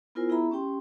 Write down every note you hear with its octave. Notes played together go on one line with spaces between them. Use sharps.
B3 E4 F4 A#4 C5 G#5
B3 E4 G#4 E5 A#5 B5
C#4 G4 G5 C6